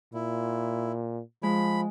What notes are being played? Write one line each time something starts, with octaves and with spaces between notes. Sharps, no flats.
A#2 E4
F3 G#3 B5